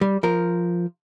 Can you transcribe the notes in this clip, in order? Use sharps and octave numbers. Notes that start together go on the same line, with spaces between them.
G3
F3 A#4